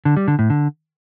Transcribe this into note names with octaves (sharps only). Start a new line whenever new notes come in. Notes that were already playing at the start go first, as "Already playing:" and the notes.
D3
G3
D3
A2
D3